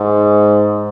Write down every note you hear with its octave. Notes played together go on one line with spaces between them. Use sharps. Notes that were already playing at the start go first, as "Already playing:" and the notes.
Already playing: G#2